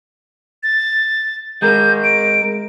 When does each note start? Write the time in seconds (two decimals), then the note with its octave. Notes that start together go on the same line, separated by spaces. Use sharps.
0.63 A6
1.62 G#3 A#4 G6
2.04 D7